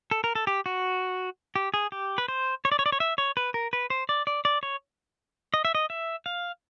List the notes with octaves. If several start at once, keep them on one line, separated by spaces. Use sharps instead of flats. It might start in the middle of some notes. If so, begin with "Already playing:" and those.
A4
A#4
A4
G4
F#4
G4
G#4
G4
B4
C5
C#5
D5
C#5
D5
C#5
E5
C#5
B4
A#4
B4
C5
D5
D5
D5
C#5
D#5
E5
D#5
E5
F5